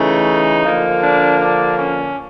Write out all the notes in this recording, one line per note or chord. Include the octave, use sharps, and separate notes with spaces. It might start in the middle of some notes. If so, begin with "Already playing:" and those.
Already playing: C#3 E3 A3 D#4
D3 F3 A#3
D4
D4
C#4